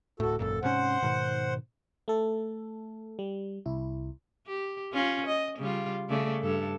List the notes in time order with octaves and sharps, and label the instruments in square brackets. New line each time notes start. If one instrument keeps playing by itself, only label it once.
[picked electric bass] D1 A2 [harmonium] F#4 A4
[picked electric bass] G#1 F#2 A#2 [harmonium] A4
[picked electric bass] G#2 C3 C#4 [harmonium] C5 F#5
[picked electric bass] G#2 B2 D#3
[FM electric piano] A3 A4
G3
C2 E4
[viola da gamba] G4
C#4 F4
D#5
C#3 G3 F4
C#3 A3 D5
G2 A4